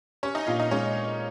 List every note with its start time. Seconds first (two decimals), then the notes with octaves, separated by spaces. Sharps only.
0.23 C#4 G4 C#5
0.35 D#4 D#5
0.47 A#2 F4 F5
0.60 D#4 D#5
0.71 G#3 C#4 C#5